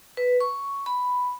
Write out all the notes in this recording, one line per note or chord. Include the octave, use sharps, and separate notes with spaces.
B4
C#6
B5